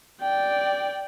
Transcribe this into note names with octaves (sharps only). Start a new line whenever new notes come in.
D5 G5